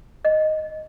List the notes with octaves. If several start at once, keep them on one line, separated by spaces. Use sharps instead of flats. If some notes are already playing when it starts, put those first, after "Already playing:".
D#5